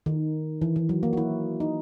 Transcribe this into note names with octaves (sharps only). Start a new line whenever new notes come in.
D#3
E3
E3
F#3
A#3
F#4
E4
D#4